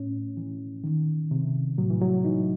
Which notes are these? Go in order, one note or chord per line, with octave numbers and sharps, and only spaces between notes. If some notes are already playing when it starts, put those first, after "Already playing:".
Already playing: A2 C#4
E3
D#3
C3
A2 F#3
E3
F#3
E3 D#4